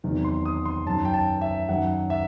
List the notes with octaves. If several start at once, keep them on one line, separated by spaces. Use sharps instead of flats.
E2 C3 D#3 F#3
C6
D#6
C6
F#2 D#3 F#3 A5
G5
A5
E5
F#2 D#3 F#3 F#5
E5